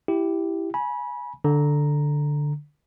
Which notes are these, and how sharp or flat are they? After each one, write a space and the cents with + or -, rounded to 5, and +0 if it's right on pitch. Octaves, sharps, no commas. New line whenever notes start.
E4 +5 G4 +0
G#5 +15 B5 -25
D3 +0 A#5 +0